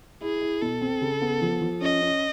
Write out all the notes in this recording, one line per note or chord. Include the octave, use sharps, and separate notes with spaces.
E4 G#4
E4
B2 A4
C4
C#3
B3
F3
F3
C#4 D#5
C#4